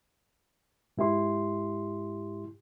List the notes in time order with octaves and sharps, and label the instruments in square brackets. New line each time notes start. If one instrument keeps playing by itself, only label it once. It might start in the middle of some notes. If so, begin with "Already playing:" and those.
[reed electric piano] G#2 E4 G4 C6